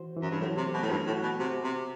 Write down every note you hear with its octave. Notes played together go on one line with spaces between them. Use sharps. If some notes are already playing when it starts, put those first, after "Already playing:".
Already playing: E3 F#4 C5
E3
F#2
G2
A2 F#3
C3
A3
B2
A2
G2 F#4
A2
F#4
B2
C3 F#4
C3 B3